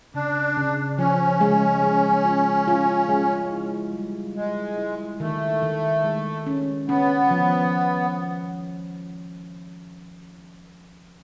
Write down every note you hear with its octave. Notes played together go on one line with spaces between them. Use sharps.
C#3 D4
C#3
F3 C#4
G#3
G#3
F4
F4
G#3
E4
G3
G#3 E4
E4
D#3 A3
D#3
G#3
C#4
B3 C#4
F3